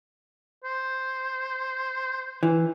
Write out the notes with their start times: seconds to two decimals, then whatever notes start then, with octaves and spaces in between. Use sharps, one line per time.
0.64 C5
2.43 E3